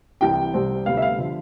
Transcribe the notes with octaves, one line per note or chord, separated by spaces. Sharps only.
C2 C3 E3 G5
C2 C3 G3 C4
D2 C3 G3 B3 F5
E5
F5
D3 F3